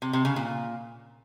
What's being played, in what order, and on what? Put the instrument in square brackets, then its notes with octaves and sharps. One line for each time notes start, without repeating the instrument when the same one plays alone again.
[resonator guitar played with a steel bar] C3
C3
C#3
A#2